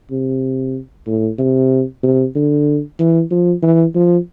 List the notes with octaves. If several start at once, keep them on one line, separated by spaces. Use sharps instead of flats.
C3
A2
C3
C3
D3
E3
F3
E3
F3